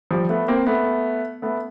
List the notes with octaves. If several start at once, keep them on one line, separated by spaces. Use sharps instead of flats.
F3 G3
A3 B3
A#3 C4
A3 B3
A3 B3